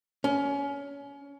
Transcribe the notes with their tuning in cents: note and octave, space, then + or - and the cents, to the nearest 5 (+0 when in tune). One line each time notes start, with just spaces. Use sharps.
C#4 +25